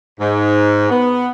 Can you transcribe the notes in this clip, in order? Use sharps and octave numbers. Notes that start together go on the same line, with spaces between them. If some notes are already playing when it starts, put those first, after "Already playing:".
G#2
B3